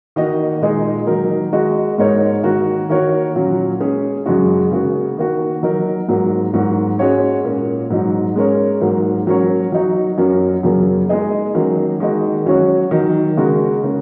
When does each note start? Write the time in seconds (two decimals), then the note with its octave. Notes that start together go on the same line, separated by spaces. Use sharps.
0.16 D#3 A#3 F#4 D#5
0.61 A#2 G#3 D#4 G#4
1.07 D#3 F#3 D#4 A#4
1.53 G#3 F#4 D#5
1.98 G#2 G#3 D#4 A#4 C#5
2.43 D#3 A#3 F#4 A#4
2.89 D#3 A#3 F#4 A#4 C#5
3.35 A#2 F#3 C#4
3.80 G#3 C#4 G#4
4.26 F#2 C#3 G#3 F#4
4.71 C#3 A#3 F#4
5.17 D#3 A#3 F#4
5.63 F#3 D#4 A#4
6.08 G#2 F#3 A#3
6.54 G#2 F#3 A#3 F#4
6.99 G#3 C#4 F#4 C#5
7.45 A#2 A#3 C#4
7.90 G#2 F#3 D#4
8.36 G#3 C#4 A#4 C#5
8.81 G#2 F#3 A#3
9.27 F#3 C#4 A#4 C#5
9.72 F#3 D#4 F#4
10.18 F#2 F#3 C#4 A#4
10.63 F#2 C#3 F#3 A#3
11.09 G#3 D#4 G#4 D#5
11.54 D#3 F#3 A#3 C#4
12.00 D#3 G#3 F#4 D#5
12.46 F#3 C#4 F#4 C#5
12.91 D#3 F#3 D#4
13.37 C#3 G#3 F#4 A#4
13.83 C#3 A#3 C#4